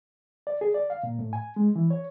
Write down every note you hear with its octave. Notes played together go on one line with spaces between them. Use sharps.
D5
G#4
D5
F5
A#2
A2
G#5
G#3
E3
C#5